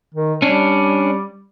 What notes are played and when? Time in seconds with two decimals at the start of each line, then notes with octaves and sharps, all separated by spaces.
0.14 D#3
0.42 G3 C#4 D4